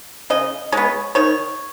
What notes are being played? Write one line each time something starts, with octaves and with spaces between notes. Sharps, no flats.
C#3 D#5
G#3 B3 C#5
D#3 C#5